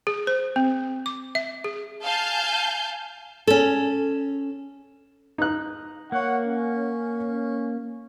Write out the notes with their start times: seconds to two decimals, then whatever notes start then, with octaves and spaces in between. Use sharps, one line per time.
0.07 G#4
0.27 C5
0.56 C4
1.06 D6
1.35 E5
1.64 G#4
2.03 F5 G#5 A5 G6
3.47 C#4 A4
5.38 D#4 F#6
6.12 A#3 C#5 F#5
6.46 C#4